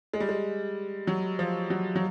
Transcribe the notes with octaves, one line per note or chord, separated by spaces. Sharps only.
G#3
G3
G#3
F#3
F3
F#3
F#3